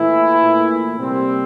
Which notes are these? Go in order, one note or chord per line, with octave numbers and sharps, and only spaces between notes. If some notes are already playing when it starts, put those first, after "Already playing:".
Already playing: A#2 E3 A3 E4
A#2 A3
C3 G3 A#3 C4